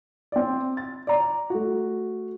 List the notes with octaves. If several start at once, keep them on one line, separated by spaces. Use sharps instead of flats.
C4 D5
A6
D5 A#5
A3 F#4